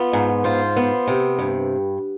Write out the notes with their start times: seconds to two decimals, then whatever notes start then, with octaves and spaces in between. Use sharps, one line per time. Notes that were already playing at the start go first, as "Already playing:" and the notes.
Already playing: B3 F4
0.13 G#2
0.44 F4 C5
0.76 B3
1.08 C3
1.39 G2